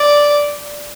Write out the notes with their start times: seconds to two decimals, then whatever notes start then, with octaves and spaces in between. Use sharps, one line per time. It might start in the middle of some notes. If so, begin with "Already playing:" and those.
Already playing: D5